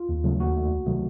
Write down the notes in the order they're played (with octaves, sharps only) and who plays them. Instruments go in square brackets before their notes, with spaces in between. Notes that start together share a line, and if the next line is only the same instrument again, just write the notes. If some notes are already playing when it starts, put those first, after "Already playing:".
Already playing: [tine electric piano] F4
D#2
C#3 F#3 A3
D#2 F#4
D#3 A3
C#2
C3 D#3 F#3 A3